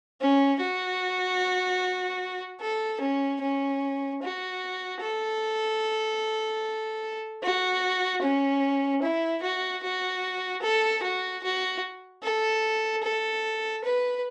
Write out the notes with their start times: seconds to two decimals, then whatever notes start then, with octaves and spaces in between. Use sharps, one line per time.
0.21 C#4
0.61 F#4
2.61 A4
3.01 C#4
3.41 C#4
4.22 F#4
5.01 A4
7.43 F#4
8.22 C#4
9.02 E4
9.42 F#4
9.83 F#4
10.62 A4
11.03 F#4
11.43 F#4
12.23 A4
13.03 A4
13.84 B4